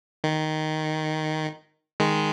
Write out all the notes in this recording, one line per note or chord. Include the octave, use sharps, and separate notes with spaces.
D#3
D#3 G#3